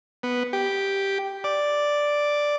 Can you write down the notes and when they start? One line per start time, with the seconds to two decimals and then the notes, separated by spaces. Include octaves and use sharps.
0.23 B3
0.53 G4
1.44 D5